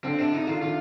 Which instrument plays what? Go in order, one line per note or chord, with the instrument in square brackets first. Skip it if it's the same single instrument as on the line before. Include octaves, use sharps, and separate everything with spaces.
[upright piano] D3 [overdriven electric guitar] C4
[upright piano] C3 [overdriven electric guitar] D4
[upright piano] C3 [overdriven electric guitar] D#4
[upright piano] D#3 [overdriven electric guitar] F4
[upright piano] D#3 [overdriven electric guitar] F4